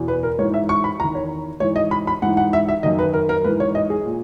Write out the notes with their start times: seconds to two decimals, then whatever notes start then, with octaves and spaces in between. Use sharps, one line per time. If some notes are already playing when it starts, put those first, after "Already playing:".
Already playing: E2 B2
0.08 B4
0.23 A#4
0.39 G#2 C#5
0.42 E3
0.54 E5
0.69 C#6
0.84 B5
1.00 E2 D#3 A#5
1.15 C#5
1.60 G#2 E3 C#5
1.76 D#5
1.91 B5
2.07 B5
2.22 G#2 E3 F#5
2.37 F#5
2.53 E5
2.69 E5
2.83 F#2 D#3 D#5
2.99 B4
3.14 A#4
3.29 A#4
3.44 G#2 E3 B4
3.60 C#5
3.75 D#5
3.90 G#4
4.06 A#2